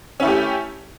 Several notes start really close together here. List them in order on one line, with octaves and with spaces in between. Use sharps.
C#4 E4 A3 G4